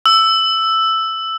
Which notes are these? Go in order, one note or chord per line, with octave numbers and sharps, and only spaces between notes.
E6